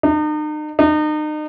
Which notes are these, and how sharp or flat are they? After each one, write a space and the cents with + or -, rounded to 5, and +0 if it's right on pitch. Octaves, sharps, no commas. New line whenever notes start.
D#4 -40
D#4 -35